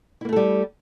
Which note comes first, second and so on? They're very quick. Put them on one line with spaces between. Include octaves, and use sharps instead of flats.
E4 A#3 A3 A4 G3